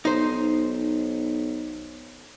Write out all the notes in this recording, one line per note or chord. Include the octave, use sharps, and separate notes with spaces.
B1 D#4 C5